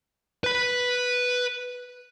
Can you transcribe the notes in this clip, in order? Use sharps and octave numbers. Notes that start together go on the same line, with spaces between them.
B4 B5